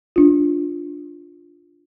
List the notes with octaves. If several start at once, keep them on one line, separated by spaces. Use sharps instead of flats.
D4 F4